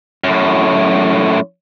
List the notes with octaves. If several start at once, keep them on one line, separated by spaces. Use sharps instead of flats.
F#2 A2